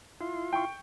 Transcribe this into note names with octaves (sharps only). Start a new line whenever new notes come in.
E4 F4 C6
G5 C#6